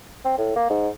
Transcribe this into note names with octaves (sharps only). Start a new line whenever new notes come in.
C4
A2
A#3
G#2